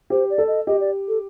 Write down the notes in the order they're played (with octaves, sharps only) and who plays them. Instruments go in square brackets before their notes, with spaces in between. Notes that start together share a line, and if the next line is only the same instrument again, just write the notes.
[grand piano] G4 [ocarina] C5
[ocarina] D5
[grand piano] A4
[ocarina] D#5
[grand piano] G4 [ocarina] D#5
[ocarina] D5
A4